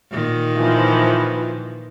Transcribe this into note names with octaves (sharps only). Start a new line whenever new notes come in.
A#2 D#3
E3 F3